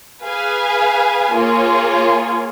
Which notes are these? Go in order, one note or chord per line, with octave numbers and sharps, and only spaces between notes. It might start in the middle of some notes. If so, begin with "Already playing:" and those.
G#4 B4 F5 G#5
A#3 F4 G#4 C#5